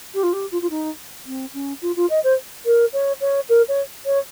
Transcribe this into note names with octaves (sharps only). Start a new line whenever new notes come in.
G4
F4
G4
F4
F4
D#4
C4
C#4
F4
F4
D#5
C5
A#4
C#5
C#5
A#4
C#5
C#5